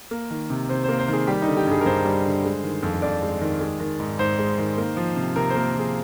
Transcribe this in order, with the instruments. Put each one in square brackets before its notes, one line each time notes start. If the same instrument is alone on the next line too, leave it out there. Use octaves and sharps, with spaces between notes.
[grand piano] A#3
D#3
C3
C3 C5
A#3 C5
C5
D#3 G#4
G3 G4
D#4
D3
G4
G2 G#4
A#4
G2 C5
G3
D3
G#3
D#3
F2
F2 D5
G#3
D#3
G#3
D#3
G#2
G#2 C5
G#3
D#3
A#3
F3
C3
C3 A#4
C5
A#3
F3 G#4